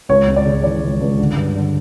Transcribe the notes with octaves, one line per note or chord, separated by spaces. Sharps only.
C#2 C#5
C#2
D5
C#3
E3 D5
C#2
C#2
D3
G2
D3